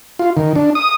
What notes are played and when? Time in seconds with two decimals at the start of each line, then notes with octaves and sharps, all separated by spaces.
0.19 F4
0.37 D#3
0.56 D4
0.75 D#6